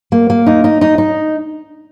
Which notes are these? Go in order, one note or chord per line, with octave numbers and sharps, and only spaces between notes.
A#3
A#3
D#4
D#4
D#4
D#4